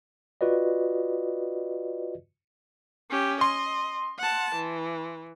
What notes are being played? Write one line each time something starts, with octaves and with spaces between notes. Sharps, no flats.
F4 F#4 B4 D5 D#5
C#4 G4
D#5 C6
F#5 A5
E3